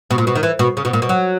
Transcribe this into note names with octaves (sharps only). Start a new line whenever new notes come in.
B2
A#2
B2
D#3
E3
B2
C#3
B2
A#2
B2
F#3